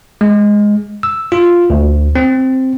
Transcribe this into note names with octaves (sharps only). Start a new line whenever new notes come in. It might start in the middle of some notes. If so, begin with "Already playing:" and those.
G#3
E6
F4
D2
C4